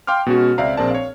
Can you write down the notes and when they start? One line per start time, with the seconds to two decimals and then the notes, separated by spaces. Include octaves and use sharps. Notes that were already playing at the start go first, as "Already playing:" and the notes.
0.07 F5 G5 C6 D6 F6
0.26 B2 G#3 C#4 F#4
0.58 C#2 C4 D5 E5 F5 A#5
0.77 A#1 C4 G#4 A#4 D5 A5
0.91 C#5 F5